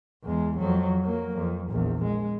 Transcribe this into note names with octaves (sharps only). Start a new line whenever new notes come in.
E2 G#3
F2 F#3
F#3 A#3
F2
A#1 E2
G#3